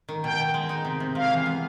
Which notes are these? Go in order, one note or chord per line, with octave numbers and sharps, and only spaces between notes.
D#3
B2 G5
B2
G#3
D#4
C3
C3
C3 F5
E3
B3